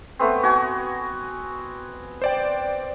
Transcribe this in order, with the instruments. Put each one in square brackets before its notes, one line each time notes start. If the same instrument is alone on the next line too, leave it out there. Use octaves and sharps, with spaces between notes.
[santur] A3 B3 C4
F#4 G#5
[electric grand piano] C5 D5 G5